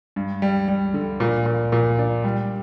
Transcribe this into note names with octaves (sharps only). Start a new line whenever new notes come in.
G2
G3
G3
D3
A#2
A#2
A#2
D4
G3